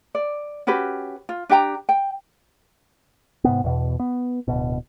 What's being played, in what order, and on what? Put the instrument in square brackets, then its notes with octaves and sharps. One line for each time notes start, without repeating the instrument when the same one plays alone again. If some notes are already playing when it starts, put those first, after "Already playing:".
[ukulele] D5
C#4 F#4 G4 B4
F4
D4 G4 G5 A#5
G5
[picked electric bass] G#2 C3 B3
E2 B2
B3
D1 G1 B2